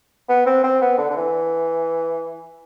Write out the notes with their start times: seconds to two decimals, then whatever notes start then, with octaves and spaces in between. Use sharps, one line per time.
0.29 B3
0.46 C4
0.63 C4
0.81 B3
0.98 D3
1.10 D3
1.16 E3